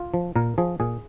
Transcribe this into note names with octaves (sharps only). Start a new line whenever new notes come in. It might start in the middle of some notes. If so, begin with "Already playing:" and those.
Already playing: F4
F3
A#2 A#4
F3 G#4
A#2 G#4